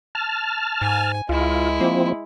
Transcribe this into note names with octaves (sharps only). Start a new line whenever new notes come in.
A5 F6
G#2 G#5
C#2 G#3 E4 F4
F3 A#3 C4